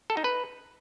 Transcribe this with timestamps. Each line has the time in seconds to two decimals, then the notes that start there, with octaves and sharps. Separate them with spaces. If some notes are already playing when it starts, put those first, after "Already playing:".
0.10 A4
0.17 D#4
0.24 B4